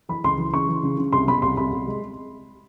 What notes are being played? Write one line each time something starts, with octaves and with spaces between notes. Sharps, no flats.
E3 B5
C#2 C6
E3
C#3 C#6
E3
C#3
C#3
C2 C6
B2 B5
C2 C6
C2 B5
C2
G#3